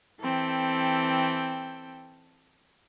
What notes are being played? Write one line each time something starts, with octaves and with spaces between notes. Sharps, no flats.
E3 C4 A4 G5